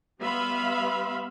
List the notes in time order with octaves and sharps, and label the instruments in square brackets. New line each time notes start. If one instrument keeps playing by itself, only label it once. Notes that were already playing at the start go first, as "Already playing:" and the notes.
[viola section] G3 B3 E5 F5 B5 C6